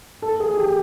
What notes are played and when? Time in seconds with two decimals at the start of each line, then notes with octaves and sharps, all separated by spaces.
0.22 A4
0.40 G#4
0.57 G4